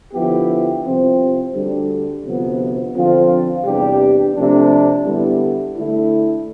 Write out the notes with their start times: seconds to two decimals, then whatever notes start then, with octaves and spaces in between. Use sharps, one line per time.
0.13 D3 F3 B3 E4 G4
0.84 C2 C3 F3 C4
1.55 D2 D3 G3
2.25 D2 C3 F3 B3
2.95 D3 F3 C4 F4
3.65 E2 C3 G3 D4 G4
4.35 C3 F3 A3 D4
5.05 D3 G3 B3 E4
5.76 D3 A3 E4